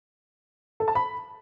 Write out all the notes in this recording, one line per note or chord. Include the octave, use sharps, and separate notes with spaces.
A4
A5
B5